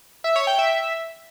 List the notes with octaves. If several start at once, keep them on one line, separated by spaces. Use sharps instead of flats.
E5
C#5
G5
E5